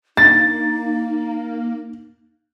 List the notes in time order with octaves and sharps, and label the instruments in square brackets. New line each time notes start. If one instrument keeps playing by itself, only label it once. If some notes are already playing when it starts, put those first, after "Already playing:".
[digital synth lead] A#3 [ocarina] D#4 [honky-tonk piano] A6